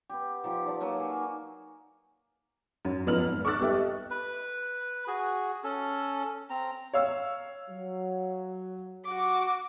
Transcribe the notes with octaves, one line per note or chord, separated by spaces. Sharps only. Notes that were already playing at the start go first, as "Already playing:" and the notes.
B3 G4
F3 D#4 G4
D#4 D5 A5
F#3 A#3 F#4
G#4
F#2
F2 B3 D#4 F6 F#7
G#1
C#6 D6 E6 F#6 A6
G3 B3 G4 A4 E5
D#5
B4
F#4 G#4
C#4 A4
C4 A#5
C#5 F5 E6
F#3
F#4 D6